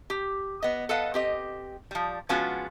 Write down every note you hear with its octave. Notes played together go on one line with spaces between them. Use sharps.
G4
B3 D#5
A4 B4 D#5 F5 F#5
C4 G4 D#5
F3 G3
F3 G#3 B3 C#4 F4 F#4